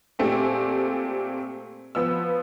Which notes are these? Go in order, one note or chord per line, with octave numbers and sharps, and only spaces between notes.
A#2 A3 C4 G4 G#4
F3 B3 E6